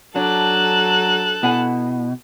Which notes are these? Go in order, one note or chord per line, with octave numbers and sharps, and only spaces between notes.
F#3 D4 A4 F#6
B2 E4 F#5 G#5